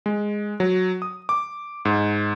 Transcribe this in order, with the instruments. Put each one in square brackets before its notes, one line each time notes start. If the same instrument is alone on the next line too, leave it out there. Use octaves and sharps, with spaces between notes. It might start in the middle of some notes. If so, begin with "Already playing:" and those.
[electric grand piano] G#3
F#3
D#6
D6
G#2